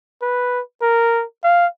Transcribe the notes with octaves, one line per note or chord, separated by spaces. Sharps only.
B4
A#4
F5